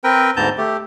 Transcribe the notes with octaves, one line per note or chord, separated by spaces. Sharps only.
C4 A#4 B4 G5
D2 G#2 B3 A5 A#5 G6
A3 G4